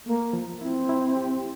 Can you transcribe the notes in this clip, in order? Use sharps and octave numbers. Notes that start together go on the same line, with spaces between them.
A3 A#3
F3
C4 E4
E4
G4